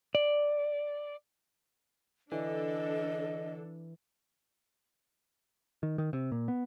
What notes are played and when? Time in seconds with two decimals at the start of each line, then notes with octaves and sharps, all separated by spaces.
0.15 D5
2.32 D3 E3 D4 A4 D#5
5.83 D#3
5.98 D#3
6.13 C3
6.32 A#2
6.48 B3